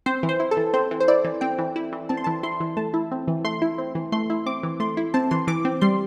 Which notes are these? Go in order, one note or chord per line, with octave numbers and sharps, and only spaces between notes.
C4 C5
E3
C5
E4
A4
E3
C4 C5
E3
C5
E4 D5
E3
C4 G5
E3
E4
E3
C4 A5
C6
E3 A5
E4 C6
E3
A3 A5
E4
C4
E3
A3 C6
E4
C4
E3
A3 C6
E4
C4 D6
E3
A3 C6
E4
C4 A5
E3 C6
E3 D6
C4
G3 C6